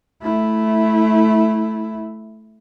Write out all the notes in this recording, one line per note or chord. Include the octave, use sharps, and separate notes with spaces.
A3 E4